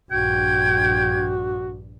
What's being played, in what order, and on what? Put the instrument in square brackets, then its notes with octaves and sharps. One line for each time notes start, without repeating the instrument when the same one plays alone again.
[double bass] A#1 G2 [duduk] F#4 [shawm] G5 [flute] G#6